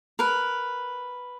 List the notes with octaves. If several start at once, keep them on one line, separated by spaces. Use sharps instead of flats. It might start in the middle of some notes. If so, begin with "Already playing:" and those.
A#4 B4